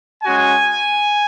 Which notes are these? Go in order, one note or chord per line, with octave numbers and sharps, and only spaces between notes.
G#3 C#4 F#4 G#5